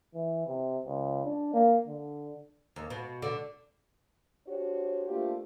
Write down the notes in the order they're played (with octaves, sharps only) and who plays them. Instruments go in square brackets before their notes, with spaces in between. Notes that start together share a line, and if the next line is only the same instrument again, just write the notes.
[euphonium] E3
C3
C#2
D4
A#3
D3
[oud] D#2
B2
D3
[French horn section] D4 F#4 G4 C5 C#5
A3 A#3 D4 F4 G4 C5